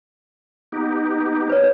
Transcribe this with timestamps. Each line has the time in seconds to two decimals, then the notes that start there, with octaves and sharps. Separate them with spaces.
0.72 B3 D#4 G4
1.49 B4 C#5